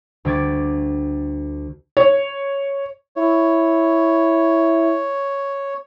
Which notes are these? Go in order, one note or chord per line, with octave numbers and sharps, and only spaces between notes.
D2 G3 A3 D6 G#6 A6
C#5
E4 C#5